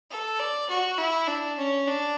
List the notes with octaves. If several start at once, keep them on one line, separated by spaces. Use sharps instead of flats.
A4
D5
F#4
E4
D4
C#4
D4